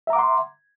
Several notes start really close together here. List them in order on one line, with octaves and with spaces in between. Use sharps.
E5 A#5 D6 F#5 C6